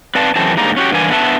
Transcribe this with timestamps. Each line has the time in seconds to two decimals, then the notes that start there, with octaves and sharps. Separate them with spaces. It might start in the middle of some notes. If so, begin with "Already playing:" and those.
0.15 C4 B4 D5 F5 A5
0.36 F#2 C#3 E3 C4 A5
0.57 G#2 D3 G3 A#3 D#4 A#5
0.77 C#4 F#4 G4
0.92 G2 D3 E3 A#3 F#4 G#5
1.10 B3 D4 B4 E5 A5